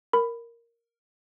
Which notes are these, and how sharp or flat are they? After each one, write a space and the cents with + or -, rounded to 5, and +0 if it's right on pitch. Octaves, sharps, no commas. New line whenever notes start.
A#4 +0 B5 +10